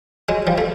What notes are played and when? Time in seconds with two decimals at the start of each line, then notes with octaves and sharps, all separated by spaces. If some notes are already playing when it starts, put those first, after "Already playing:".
0.29 F#3 G#3
0.47 F3 G3
0.58 A3